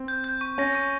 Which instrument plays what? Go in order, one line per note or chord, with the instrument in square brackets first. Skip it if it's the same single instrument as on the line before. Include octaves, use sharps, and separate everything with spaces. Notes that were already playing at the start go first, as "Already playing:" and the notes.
Already playing: [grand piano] C4
[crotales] G6
G6
C#6
[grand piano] C#4 [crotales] A#6
[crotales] C#6